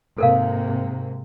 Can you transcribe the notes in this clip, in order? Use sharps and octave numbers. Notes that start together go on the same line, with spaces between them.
G#2 C3 A#3 A4 A#4 F5